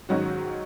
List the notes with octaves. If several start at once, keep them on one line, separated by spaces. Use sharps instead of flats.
G#2 D#3 F#3 C#4 F#4